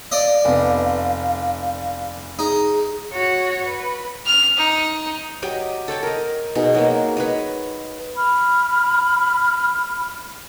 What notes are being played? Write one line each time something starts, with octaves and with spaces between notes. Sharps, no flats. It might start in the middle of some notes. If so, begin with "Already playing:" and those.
D5 D#5 F5
F1 B3
D#4 G#4
F#4 C#5
B4
F6
D#4
F#3 G4 D#5 G5
A4 C#5 G5 A5
A#4 D#5
B2 D#4 G#4
F#3 G#3 A#3
B4 C#5 D#5
B5 F6